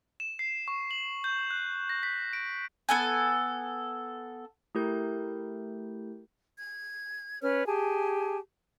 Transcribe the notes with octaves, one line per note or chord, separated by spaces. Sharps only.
E7
C7
C#6
F#7
G6
F#6
A#6
B6
D7
B3 A4 G#5
A3 E4 G4 A#4 G6
G#6
C#4 B4 C#5 F6
G4 G#4 G#5 A5